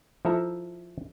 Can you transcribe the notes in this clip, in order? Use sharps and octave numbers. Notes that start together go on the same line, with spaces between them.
F3 E4 A4 E5 A#5